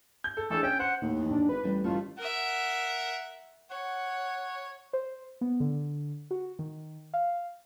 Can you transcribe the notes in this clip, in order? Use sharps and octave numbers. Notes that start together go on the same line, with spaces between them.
G6
A4
A1 D4 G#4 A4
C#4 G5
C5 F#5
D#2 A2
F2 E3
D4
G#1 B4
A1 G3
A1 D#3 G3 A3 F4
A#4 E5 F#5
C#5 F#5
C5
B3
D3
F#4
D#3
F5